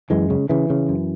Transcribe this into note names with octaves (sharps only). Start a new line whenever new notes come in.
F#2 E3 G#3
C#3
C#3 E3
C#3
F#2